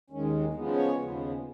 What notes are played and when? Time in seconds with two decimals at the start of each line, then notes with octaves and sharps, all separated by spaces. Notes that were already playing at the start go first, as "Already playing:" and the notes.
0.10 D#2 D#3 G#3 C#4
0.53 C#3 F3 G#3 B3 D#4
0.75 C#5
0.98 D#2 C#3 F3 G#3 B3